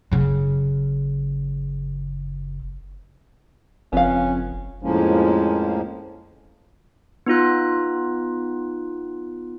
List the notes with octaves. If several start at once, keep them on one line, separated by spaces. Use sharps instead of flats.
F#1 C#3
F#1 F2 B3 C#4 F5
F2 A2 F3 G#3 A#3 C#4
B3 D#4 F4 F#6